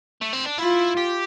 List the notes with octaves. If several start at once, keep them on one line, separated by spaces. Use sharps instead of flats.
A3
C4
D4
E4 F4
G4